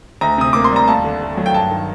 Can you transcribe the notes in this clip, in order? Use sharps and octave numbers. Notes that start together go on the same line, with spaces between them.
D2 A#5
C3 D#6
A#3 D6
C6
G3 A#5
D#2 A5
D3
A3
F#3
G5
G2 A5
D#3